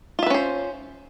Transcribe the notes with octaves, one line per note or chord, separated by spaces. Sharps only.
C#4 F4 B4 C5 E5